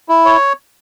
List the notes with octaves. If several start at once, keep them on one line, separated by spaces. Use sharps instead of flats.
E4
C#5